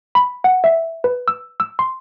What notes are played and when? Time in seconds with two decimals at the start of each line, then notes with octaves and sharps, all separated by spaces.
0.15 B5
0.44 F#5
0.64 E5
1.04 B4
1.28 E6
1.60 E6
1.79 C6